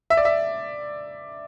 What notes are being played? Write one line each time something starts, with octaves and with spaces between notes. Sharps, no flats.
E5
D5
E5